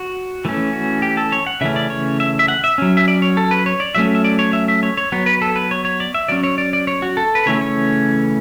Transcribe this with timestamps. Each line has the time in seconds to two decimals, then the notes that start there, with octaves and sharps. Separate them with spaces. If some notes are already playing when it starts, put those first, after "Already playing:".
Already playing: F#4
0.45 E3 A3 C#4
0.73 F#4
1.02 G4
1.17 A4
1.32 C#5
1.47 F#5
1.61 C#3 E3 A3 C#4 E5
1.76 D5
1.90 C#5
2.20 E5
2.39 E5
2.48 F#5
2.64 E5
2.78 F#3 C#4
2.97 E5
3.08 D5
3.22 C#5
3.37 A4
3.51 B4
3.66 C#5
3.80 D5
3.95 F#3 A3 C#4 E5
4.15 E5
4.24 D5
4.39 C#5
4.53 E5
4.68 E5
4.83 C#5
4.97 C#5
5.12 F#3 B3 C#5
5.26 B4
5.42 A4
5.56 B4
5.71 C#5
5.85 C#5
6.00 D5
6.14 E5
6.28 F#3 C#4 D5
6.44 C#5
6.58 D5
6.73 D5
6.87 C#5
7.02 F#4
7.17 A4
7.35 B4
7.46 C#3 E3 A3 C#4 C#5
7.61 C#5